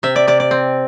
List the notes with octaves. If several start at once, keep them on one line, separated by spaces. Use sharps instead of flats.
C3 E5
D5
C3 D5
D5
C4